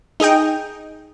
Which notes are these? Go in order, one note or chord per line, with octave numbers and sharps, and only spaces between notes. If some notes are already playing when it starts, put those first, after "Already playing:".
D#4 G#4 D#5 G5